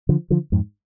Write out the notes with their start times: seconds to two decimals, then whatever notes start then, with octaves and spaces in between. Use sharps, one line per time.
0.09 D3 F3
0.30 D3 F3
0.52 F2 G#2